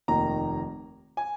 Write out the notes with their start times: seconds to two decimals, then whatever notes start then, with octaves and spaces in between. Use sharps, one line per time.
0.08 F1 D#2 D#3 A#5
1.17 G#5